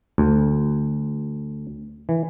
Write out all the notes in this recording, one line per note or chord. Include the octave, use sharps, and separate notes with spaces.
D2
E3